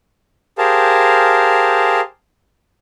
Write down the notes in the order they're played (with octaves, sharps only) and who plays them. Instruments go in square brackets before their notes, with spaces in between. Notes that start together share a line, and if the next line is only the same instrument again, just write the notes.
[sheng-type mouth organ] G4 G#4 A#4 C5 F5 A5